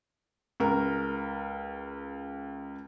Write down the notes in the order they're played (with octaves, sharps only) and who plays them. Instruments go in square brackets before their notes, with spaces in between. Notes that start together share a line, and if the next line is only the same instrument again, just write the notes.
[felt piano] C#2 A#4